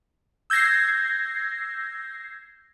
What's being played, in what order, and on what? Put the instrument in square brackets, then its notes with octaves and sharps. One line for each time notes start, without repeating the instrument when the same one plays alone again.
[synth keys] E6 G6 G#6 A#6 C7